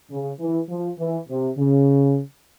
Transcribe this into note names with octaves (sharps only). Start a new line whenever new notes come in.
C#3
E3
F3
E3
C3
C#3